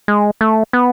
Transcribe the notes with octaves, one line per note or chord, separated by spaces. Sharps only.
G#3
A3
B3